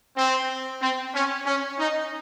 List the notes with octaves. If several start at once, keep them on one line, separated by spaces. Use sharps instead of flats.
C4
C4
C#4
C#4
D#4